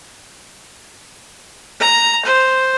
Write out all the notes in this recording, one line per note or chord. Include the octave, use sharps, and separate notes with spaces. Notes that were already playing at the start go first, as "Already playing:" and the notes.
A#5
C5